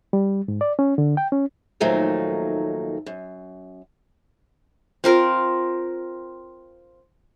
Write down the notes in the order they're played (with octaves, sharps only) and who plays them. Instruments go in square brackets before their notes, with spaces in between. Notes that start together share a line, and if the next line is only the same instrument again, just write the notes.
[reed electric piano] G3
G#2
D5
C#4
D3
G5
C#4
[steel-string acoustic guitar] D#2 A#2 F3 F#3 A3 D#4
F#2
[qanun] C4 F4 A#4